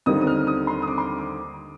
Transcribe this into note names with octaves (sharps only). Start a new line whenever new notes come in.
D#2 D3 G3 C4 D#4 D#6
D#6
F6
D#6
C6
D#6
D6
C6
D6